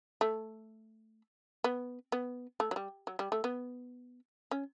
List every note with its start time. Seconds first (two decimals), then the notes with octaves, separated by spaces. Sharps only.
0.21 A3
1.64 B3
2.12 B3
2.60 A3
2.71 F#3
2.76 G3
3.07 F#3
3.19 G3
3.32 A3
3.44 B3
4.51 C#4